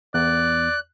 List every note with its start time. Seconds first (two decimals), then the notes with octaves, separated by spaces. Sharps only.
0.14 E2 D5 F#6